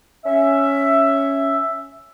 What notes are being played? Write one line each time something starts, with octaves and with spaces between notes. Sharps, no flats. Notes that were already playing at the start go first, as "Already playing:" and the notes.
C#4 E5